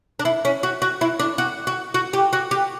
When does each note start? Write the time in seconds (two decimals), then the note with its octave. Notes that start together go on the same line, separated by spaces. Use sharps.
0.19 D4
0.25 E4
0.45 C#4
0.63 F#4
0.82 F#4
1.01 E4
1.19 D4
1.38 F#4
1.67 F#4
1.94 F#4
2.13 G4
2.33 F#4
2.51 G4